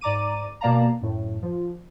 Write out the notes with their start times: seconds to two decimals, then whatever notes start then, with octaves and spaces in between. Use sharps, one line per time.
0.01 G#2 D5 A#5 D6 D#7
0.61 B2 A#3 D5 F5 A5 A#5
1.01 F#2 A2
1.42 F3